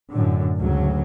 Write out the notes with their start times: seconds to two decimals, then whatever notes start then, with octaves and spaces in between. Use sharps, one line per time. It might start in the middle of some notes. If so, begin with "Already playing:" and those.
0.10 F#2 A2 D3
0.57 D2 G#2 C#3 F#3